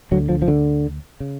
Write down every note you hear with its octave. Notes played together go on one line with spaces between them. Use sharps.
D2 D3 F#3
F3
F3
D3
C#3